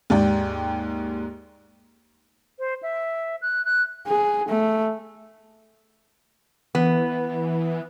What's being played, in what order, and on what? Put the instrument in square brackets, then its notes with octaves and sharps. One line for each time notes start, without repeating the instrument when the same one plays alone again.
[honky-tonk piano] D#2 G#2 D5 G5
[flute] C5
E5
F#6
F#6
[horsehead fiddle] G#4
A3
[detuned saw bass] E3 [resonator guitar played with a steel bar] B3